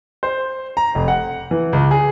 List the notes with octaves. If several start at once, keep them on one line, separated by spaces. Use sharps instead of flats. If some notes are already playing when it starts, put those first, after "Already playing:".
C5
A#5
F1
F#5
E3
C#2
G#4